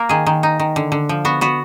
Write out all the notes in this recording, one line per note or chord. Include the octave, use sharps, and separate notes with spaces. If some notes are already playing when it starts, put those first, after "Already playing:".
Already playing: A#3 A#4
D#3 G#4
D#3
D#4
D#3
D3
D3
F3
B3 F#4
B3 F#4